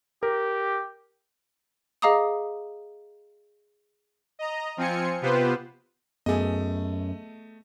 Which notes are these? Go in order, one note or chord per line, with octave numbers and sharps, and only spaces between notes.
G4 A#4
G#4 D#5 F5 A#5 D6 D#6
D#5 A#5
F3 C4 F4 G#5 C#7
C3 B3 F4 G4 B4 C5
F#2 A3 B3 G#4 D#5